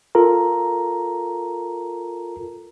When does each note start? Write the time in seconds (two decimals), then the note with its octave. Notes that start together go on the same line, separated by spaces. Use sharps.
0.15 F4 A4 A#4 A#5